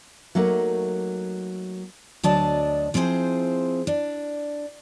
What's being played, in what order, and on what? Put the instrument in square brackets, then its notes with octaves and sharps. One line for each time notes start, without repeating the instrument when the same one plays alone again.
[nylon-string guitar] F#3 A3 A#3 D#4
[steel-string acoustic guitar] D2 F#3 D4 D#5 A5
F3 C4 E4 G#4 C5
D4